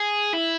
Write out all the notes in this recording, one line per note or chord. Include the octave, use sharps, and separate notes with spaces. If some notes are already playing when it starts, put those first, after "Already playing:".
Already playing: G#4
E4